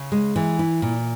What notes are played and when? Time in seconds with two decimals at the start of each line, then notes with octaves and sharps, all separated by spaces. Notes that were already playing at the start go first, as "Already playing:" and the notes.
Already playing: C#3
0.12 G#3
0.36 E3
0.59 E4
0.82 A#2